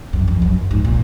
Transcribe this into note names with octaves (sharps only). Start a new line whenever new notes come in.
F#2
F2
F#2
G#2
A#2